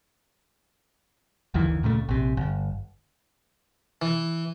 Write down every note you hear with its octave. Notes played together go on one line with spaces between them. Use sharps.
F#1 D2 D#3 E3
C#2 A#2 C#3 A3
A#1 C3
G1
E3